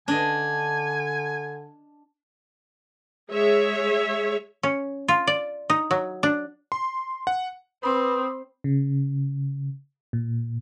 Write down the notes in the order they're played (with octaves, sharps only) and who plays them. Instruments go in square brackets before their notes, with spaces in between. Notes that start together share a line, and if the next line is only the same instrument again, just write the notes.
[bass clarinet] D3 [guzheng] D4 D#5 [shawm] G#5
[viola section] G#3 G#4 C#5 E5
[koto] C#4
F4
D5
D#4
F#3
D4
[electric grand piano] C6
F#5
[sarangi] C4 [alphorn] B4 [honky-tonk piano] B5 C6 D6 [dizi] D#6
[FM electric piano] C#3
A#2